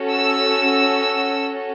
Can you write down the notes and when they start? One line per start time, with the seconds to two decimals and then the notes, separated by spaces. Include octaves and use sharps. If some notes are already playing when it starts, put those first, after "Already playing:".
Already playing: C#4 F#4 A4
0.11 E6